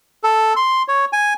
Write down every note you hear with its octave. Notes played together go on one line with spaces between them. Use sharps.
A4
C6
C#5
G#5